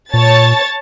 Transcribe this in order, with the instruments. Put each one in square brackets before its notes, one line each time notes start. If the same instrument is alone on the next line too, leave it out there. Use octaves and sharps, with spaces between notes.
[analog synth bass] A#2 [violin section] C#5 A5 A6